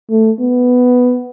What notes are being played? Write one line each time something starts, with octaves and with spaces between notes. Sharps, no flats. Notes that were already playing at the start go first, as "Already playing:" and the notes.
A3
B3